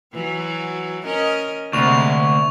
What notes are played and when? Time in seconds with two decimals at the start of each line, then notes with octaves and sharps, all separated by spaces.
0.14 E3 F#3 F#4
1.04 C#4 A#4 D#5
1.73 D2 C3 G#3 A#3 C#6 F7